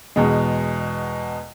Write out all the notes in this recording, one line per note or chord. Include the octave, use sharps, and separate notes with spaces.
E2 B2 G#3